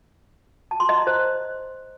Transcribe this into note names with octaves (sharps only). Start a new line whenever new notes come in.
A5
C6
D#5
A#5
C5